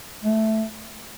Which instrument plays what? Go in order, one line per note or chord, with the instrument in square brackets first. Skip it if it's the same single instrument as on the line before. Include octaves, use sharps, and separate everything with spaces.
[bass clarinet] A3